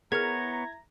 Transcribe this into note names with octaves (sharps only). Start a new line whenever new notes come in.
B3 E4 G#4 A#4 C#5 A#5 F6 G#6